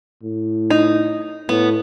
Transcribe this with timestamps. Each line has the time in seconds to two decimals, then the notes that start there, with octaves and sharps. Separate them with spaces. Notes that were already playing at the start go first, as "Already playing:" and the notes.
0.23 A2
0.70 D#4
1.49 A2 B3